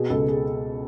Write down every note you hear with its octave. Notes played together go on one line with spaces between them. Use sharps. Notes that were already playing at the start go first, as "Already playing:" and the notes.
Already playing: B2 G#4
C#2 A4
G#4